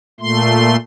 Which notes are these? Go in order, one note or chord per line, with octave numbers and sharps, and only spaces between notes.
A#2 A3 C6